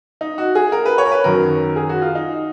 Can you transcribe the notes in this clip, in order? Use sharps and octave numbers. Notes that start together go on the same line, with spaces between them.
D#4
F#4
G#4
A#4
B4
C#5
A#4
B4
F#2 D#3 F#3 A#4
G#4
F#4
F4
D#4